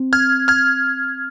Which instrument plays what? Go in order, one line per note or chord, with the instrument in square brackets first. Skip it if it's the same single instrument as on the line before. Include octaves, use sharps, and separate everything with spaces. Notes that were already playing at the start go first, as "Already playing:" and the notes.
Already playing: [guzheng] C4
[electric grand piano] F6 G#6
F6 G#6